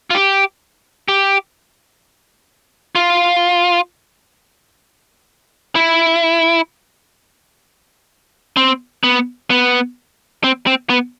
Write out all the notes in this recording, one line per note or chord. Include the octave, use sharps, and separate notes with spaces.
F4
G4
G4
F4
E4
C4
B3
B3
C4
C4
B3